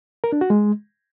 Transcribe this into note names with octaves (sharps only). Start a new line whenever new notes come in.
A#4
D4
F#4
G#3